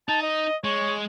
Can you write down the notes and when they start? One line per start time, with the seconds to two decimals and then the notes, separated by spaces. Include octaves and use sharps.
0.09 D#4 A5
0.22 D#5
0.64 G#3 C#5